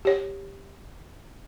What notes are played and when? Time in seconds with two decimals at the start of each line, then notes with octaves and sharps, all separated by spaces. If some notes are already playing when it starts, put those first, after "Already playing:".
0.05 G4 C#5